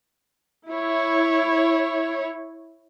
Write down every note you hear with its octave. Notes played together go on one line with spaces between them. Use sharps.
E4 C#5